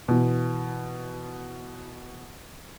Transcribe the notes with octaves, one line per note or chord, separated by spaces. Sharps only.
B2 E3